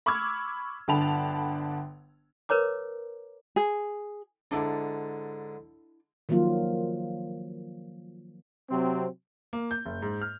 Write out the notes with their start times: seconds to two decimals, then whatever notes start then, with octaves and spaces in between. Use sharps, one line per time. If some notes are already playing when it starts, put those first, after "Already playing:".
0.06 B5 C#6 D6 E6 F6 G#6
0.88 G1 D3 G5 A5 B5 F7
2.49 A#4 B4 C#5 A#5 D6
3.56 G#4
4.51 G#2 D3 D4 E4 D5
6.29 D#3 F3 F#3 A#3 F4
8.70 C3 F#3 C4
9.53 A#3
9.71 G6
9.86 F#1
10.02 G#2
10.22 F6